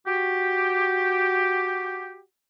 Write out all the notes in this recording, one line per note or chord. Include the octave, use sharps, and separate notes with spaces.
F#4 G4